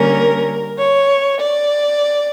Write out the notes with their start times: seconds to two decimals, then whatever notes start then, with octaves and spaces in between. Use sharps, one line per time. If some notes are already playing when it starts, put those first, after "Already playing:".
Already playing: D3 G3 A#3 C#4 A#4
0.79 C#5
1.41 D5